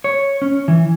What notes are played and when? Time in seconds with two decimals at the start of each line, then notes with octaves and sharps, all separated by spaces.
0.04 C#5
0.42 C#4
0.68 E3